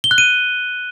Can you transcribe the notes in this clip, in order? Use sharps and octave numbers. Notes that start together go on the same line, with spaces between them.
G7
F#6
D#7